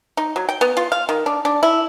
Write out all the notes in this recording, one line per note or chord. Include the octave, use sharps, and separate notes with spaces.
D#4
F#3
G5
B3
F4
F5
D#3
D4
D4
E4